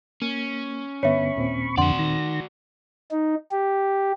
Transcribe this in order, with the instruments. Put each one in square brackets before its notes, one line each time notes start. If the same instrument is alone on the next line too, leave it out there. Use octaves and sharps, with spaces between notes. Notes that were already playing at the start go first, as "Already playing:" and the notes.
[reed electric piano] A#3 [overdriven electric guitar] C#4
[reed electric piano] G2 D3 B3 [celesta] C#5 E5 [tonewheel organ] B5 C#6
[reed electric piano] D#2 A#2 C4
[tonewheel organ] F2 D3 [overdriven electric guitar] F#4 D5 [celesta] F#5 C6
[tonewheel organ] D#3 A#6
[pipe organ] D#4
G4